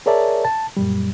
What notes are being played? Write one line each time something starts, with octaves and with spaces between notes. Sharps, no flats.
G#4 A#4 C#5 D5 E5 A5
A5
F#2 A#2 G3